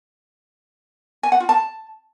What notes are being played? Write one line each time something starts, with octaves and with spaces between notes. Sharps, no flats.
G#5
F#5
F4
A5